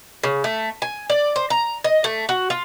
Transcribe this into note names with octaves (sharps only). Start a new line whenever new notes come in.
C#3
A3
G#5
D5
C5
A#5
D#5
A3
F#4
F4